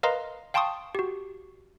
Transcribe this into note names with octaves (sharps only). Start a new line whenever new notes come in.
A#4 B4 D#5 F5 A#5 C6
F5 G5 A5 C6 C#6 D#6
F#4 G4